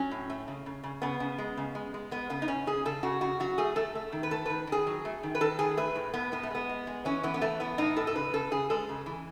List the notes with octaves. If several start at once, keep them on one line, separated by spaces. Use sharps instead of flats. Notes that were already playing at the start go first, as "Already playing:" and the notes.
Already playing: F#3 C#4
A2
A3
C#3
C#3
C#3
C#3 B3
C#3
G#3
C#3
G#3
G#3
G#3 B3
C#3 B3
D#4
C#3 C#4
C#3 G#4
C#3 A4
C#3 F#4
C#3 F#4
F#3 F#4
A3 G#4
A3 A4
A3
D#3
B4
A3 A4
D#3 B4
D#3 G#4
F#3
A3
D#3
B4
D#3 A4
D#3 G#4
A3 B4
A2
A2 B3
A2 B3
A3
G#3 B3
G#3
G#3
E3 C#4
E3 B3
B3
E3 A3
E3 B3
A2 D#4
A2 A4
A4
C#3 B4
C#3 A4
C#3 G#4
G#3 A4
C#3
E3